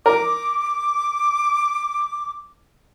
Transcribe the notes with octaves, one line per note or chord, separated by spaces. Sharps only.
A#4 D6